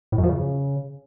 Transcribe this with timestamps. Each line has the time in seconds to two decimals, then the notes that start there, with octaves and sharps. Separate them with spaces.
0.12 A2
0.18 F#2
0.23 F3
0.29 C#3